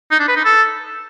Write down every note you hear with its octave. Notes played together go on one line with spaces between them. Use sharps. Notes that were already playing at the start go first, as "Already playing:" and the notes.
D#4
D4
B4
D#4
A4